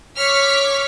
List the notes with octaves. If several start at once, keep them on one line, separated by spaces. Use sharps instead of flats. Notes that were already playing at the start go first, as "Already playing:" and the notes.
C#5 C#6 D6 F6 B6 C#7